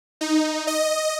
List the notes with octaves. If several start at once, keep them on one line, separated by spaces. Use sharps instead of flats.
D#4
D#5